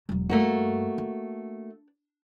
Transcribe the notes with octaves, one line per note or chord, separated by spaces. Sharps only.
E1 F#3
G2 A3 A#3 F#4
D4